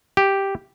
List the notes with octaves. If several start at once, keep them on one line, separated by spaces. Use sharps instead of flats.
G4